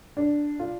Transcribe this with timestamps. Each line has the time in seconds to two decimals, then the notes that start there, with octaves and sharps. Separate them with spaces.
0.17 D4
0.60 F4